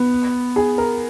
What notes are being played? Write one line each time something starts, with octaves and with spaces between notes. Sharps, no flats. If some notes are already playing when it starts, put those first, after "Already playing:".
Already playing: B3
G#4
A#4